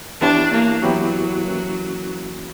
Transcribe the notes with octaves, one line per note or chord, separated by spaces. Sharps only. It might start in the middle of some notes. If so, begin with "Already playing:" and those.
E3 B3 D4 E4 G4 C#5
A#3
E3 F#3 B3 E4 G4 C#5
E3 A#3 C#4